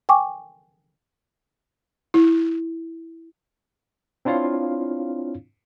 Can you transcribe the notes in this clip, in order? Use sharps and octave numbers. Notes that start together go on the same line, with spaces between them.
G5 G#5 C#6 D6
E4
C4 D4 E4 F4 C#5 F5